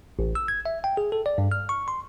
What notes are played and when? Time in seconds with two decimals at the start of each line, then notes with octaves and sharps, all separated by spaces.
0.19 A1
0.35 E6
0.48 G#6
0.66 E5
0.84 G5
0.97 G#4
1.12 A4
1.26 D5
1.38 G2
1.52 F6
1.69 C#6
1.88 C6